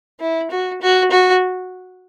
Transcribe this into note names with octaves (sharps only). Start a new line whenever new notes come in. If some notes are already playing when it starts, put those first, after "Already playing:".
E4
F#4
F#4
F#4